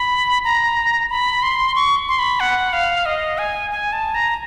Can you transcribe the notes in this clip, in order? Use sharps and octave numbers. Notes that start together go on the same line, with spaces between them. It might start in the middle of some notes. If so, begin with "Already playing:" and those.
Already playing: B5
A#5
B5
C6
C#6
C6
B5
F#5
F5
D#5
G#5
G#5
A5
A#5